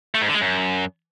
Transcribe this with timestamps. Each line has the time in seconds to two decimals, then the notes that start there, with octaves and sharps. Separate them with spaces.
0.15 A3
0.21 G#2
0.28 D3
0.34 G#3
0.41 F#2